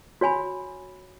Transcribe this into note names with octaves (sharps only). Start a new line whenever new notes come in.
F#4 C#5 G#5 B5